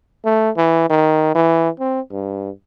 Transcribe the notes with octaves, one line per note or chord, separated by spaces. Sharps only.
A3
E3
D#3
E3
C4
G2